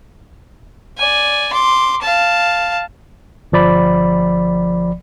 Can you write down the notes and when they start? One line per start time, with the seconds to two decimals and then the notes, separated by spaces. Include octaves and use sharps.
0.97 D5 G#5
1.53 C6 D6
2.01 F5 A5
3.52 G1 F3 D5 B5